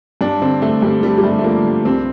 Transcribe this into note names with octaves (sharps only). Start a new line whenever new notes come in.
G2 D4
D3 C4
G2 A3
G2 G3
D3 G3
G3
G2 A3
A3
F3 A#3
G2
C2 C4